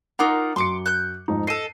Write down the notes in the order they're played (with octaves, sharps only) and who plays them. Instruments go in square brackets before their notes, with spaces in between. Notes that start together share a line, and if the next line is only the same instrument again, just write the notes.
[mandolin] D#4 F4 A#4 [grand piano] F#5 D6
[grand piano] F#2 C#7 [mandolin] C6 D6
[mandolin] F#6 G6
[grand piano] F2 G#2 D#4
[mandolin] A4 D#5 [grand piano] C7 D#7